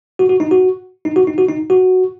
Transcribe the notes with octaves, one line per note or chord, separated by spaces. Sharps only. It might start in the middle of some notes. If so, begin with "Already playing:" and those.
F#4
F#4
D#4
F#4
D#4
F#4
D#4
F#4
D#4
F#4